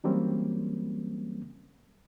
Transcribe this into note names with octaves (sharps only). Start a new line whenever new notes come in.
E3 F#3 G3 A#3 C4 C#4